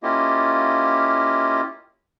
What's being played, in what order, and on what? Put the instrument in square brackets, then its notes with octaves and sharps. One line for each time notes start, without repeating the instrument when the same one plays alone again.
[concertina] A#3 C#4 E4 F4 G4 D#5